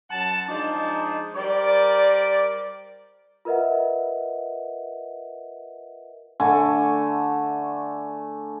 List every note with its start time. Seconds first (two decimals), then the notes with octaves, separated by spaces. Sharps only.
0.10 F#2 F#3 F#5 A5
0.48 F3 G#3 D4 D#4
1.36 G3 A#4 C5 D5
3.45 F4 A#4 B4 D#5 E5 F#5
6.40 D3 A3 G#5